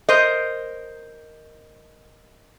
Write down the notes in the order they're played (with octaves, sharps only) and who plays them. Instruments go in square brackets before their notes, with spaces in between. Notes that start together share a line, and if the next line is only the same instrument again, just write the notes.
[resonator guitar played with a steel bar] A#4 C5 D#5